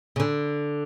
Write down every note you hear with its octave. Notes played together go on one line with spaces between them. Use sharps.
C#3
D3